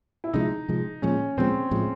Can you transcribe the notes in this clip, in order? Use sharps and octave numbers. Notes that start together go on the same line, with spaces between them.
E4
C3 F3 G#3 D#4
C3 F3 G#3
A#2 F3 G#3 C#4
A#2 F3 G#3 C4
A2 F3 G#3